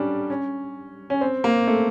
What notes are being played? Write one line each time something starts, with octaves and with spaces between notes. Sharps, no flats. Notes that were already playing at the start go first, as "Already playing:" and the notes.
Already playing: G3 C#4 D4
C#4
C#4
C4
A#3
A3